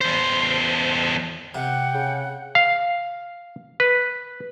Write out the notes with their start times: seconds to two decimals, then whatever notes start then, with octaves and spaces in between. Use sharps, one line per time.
0.01 E2 C5
1.55 C3 F#5 G5
1.94 C#3
2.55 F5
3.80 B4